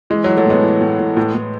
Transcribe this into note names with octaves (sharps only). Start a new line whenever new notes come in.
E3 G#3
E3 F#3
F#3 A3
A2 G#3 B3
E3
A2
A2
A2
A2